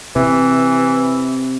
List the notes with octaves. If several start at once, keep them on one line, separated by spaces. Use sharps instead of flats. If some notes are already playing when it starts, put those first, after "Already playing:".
C3 E3